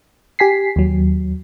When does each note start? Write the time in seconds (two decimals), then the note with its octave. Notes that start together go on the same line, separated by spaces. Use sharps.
0.39 G4 G#5 B6 C7
0.76 D#2 F#3